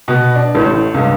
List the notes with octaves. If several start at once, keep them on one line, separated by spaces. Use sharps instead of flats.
B2
D4
A1 A2
C#2 G2